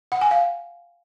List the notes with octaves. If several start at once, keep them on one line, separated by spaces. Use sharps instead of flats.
F#5
G#5
F5